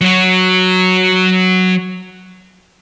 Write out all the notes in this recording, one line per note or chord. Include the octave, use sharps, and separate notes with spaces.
F#3 F#4